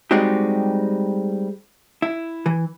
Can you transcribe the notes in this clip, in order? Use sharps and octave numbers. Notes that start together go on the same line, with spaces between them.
G3 G#3 C4 D#4 F#4 G4
E4
E3